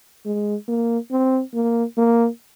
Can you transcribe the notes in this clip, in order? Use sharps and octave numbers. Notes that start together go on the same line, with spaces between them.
G#3
A#3
C4
A#3
A#3